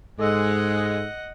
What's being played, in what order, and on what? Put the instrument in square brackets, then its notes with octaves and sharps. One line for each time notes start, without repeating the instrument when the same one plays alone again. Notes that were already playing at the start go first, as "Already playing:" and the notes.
[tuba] G#2 [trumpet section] G#3 [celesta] A4 E6 [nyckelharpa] D#5 F#5